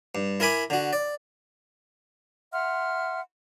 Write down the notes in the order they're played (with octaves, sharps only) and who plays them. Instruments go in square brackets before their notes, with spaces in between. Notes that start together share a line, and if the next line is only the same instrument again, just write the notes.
[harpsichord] G2
E4 A#4 G#5 B5 D6
D3 F#4
D5
[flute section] E5 F#5 C6 F6